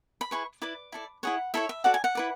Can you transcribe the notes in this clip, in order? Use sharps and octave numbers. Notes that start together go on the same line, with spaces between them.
B5
E4 G#4 B4 C#6
E4 B4 D5 D6
E4 A4 D5
E4 G#4 C#5 F#5
E4 A4 C#5 E5
E5
F#4 A4 D5 F#5
G#5
F#5
E4 B4 D5